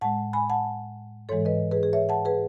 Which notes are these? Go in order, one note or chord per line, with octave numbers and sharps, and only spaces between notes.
A2 G#3 F#5 A5
G#5 B5
F#5 A5
G#2 E3 G#3 A4 C#5
B4 D#5
G#4 B4
G#4
C#5 E5
F#5 A5
G#4 B4